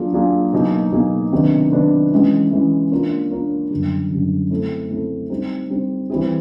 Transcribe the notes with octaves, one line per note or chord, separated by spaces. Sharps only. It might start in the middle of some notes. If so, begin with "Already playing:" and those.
Already playing: F#3 A#3 D4 F4 G#4
F#3 A#3 D4 F4 G#4
B2 F#3 A#3 D#4 G#4
B2 F#3 A#3 D#4 G#4
C3 D#3 F#3 B3 D4
C3 D#3 F#3 B3 D4
E3 G#3 C#4 E4
E3 G#3 C#4 E4
A#3 D4 F4 A#4 C#5
A#3 D4 F4 A#4 C#5
F#2 D3 G3
F#2 D3 G3
A3 C4 E4 A4
A3 C4 E4 A4
G3 C4 D#4
G3 C4 D#4
E3 G3 C4 E4 G#4